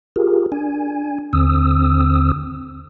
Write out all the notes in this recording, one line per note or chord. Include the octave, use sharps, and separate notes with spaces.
F4 G4 G#4 A#4
D4 G#5
D#2 D3 C4 D#6 E6